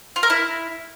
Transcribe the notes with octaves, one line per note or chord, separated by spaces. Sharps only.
F4
A#4
E4